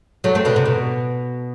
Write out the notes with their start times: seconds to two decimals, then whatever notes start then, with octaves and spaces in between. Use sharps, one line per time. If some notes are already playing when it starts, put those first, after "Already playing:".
0.24 F#3 A3
0.35 A3 C4
0.45 B2 D3
0.56 C3
0.65 B2